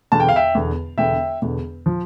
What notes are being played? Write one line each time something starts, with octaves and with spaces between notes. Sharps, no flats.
E1 E2 D3 A5
G5
F5
E5 G5
E1 E2 D3
E1 E2 D3 E5 G5
E1 E2 D3
F3